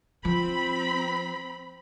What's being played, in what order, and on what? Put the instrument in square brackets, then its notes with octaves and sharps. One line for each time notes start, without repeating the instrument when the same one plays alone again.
[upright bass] F3 [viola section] C4 B5